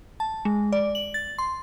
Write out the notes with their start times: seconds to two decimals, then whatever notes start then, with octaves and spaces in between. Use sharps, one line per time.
0.20 A5
0.45 G#3
0.72 D5
0.95 F#7
1.14 A6
1.38 C6